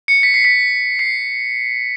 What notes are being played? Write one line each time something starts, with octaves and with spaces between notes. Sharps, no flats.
C#7
B6
C7
B6
C7